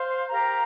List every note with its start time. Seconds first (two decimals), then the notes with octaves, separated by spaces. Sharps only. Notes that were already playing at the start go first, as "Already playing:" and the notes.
Already playing: C5 F5 C6
0.28 G4 A#4 F5 A#5